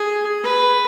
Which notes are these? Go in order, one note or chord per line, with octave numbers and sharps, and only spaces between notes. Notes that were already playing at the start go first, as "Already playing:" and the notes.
Already playing: G#4
B4